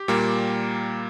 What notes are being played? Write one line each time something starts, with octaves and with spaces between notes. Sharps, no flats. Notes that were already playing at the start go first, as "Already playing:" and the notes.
Already playing: G4
A#2 G3 A#3